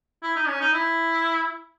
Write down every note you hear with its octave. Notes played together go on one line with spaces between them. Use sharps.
E4
D#4
C#4
D#4
E4